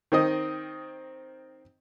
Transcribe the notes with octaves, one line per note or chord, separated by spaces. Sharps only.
D#3 C4 D#5